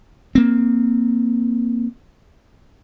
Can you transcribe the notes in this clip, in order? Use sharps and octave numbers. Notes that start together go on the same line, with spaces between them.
A#3 C4